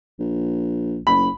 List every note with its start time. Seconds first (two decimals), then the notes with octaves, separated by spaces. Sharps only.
0.19 A#1
1.07 F#1 B5